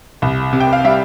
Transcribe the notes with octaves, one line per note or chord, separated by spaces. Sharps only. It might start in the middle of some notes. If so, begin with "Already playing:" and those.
C2
C3
G5
F5
G3 E5